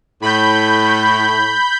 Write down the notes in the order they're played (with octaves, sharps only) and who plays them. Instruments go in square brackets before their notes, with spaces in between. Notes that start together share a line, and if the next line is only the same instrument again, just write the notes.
[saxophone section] A2 [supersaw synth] B5 G6